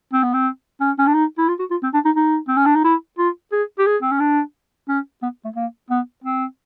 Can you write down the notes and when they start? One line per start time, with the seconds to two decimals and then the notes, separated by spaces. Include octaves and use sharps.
0.13 C4
0.23 B3
0.33 C4
0.81 C#4
0.99 C#4
1.07 D4
1.14 D#4
1.38 E4
1.49 F4
1.59 F#4
1.71 F4
1.83 C4
1.94 D4
2.05 D#4
2.16 D#4
2.48 C4
2.57 C#4
2.66 D4
2.76 D#4
2.84 E4
3.18 F4
3.52 G#4
3.79 G4
3.87 G#4
4.02 C4
4.12 C#4
4.20 D4
4.89 C#4
5.23 B3
5.45 A3
5.56 A#3
5.90 B3
6.24 C4